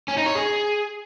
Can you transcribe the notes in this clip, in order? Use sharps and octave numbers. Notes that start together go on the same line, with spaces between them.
C#4
D#4
C#5
G#4